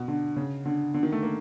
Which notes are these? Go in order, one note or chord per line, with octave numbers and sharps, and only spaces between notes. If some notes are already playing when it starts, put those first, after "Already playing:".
Already playing: B2
D3
C#3
D3
D3
D#3
A3
A#3